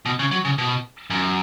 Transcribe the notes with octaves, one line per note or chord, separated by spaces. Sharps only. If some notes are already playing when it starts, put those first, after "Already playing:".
B2
C#3
F#3
C#3
B2
F#2